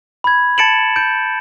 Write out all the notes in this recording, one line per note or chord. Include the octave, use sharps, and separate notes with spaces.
B5 G#6
A5 A6 C#7 D7 E7 F#7
G6 D7